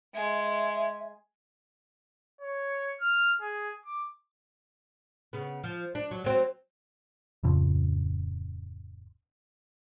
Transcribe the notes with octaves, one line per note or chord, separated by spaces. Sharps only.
G#3 E5 G#5
C#5
F6
G#4
D6
C#3 B3
F3
D4
F#3
F#3 C4
D1 F2 C#3 F3